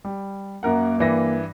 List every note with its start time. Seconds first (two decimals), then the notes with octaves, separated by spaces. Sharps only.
0.05 G3
0.63 F#2 A#3 A#4 F#5
0.99 G2 E3 A#6